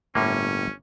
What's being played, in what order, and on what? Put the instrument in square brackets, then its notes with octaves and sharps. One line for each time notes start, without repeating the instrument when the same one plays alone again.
[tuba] G1 [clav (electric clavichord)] A2 A#3 [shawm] C#4